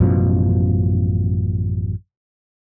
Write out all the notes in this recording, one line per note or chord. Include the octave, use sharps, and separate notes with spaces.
A1 F#2 B2 F3